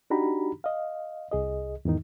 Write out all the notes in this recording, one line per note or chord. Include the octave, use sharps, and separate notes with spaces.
D4 D#4 F#4 G4 A#5 B5
D#5 F5
C2 G#4 D#5
E2 G#2 D#3 D#4